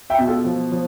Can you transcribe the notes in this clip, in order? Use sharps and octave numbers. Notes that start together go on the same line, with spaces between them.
E5 G5
B2
F4 A4
F3
F3